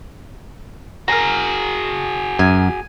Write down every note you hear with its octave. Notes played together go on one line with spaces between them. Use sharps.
F#4 G#4 A#4 A#5
F#2 G#5